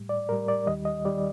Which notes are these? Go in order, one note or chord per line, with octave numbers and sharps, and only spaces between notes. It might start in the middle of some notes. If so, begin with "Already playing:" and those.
Already playing: A2 G3
D5
A2 G3 A#4
D5
D#2 D#3 G3 D#5
D#5
D#3 G3 D5